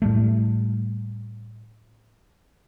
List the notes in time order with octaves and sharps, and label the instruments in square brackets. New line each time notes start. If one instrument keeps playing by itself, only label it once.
[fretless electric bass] A2 G3 A3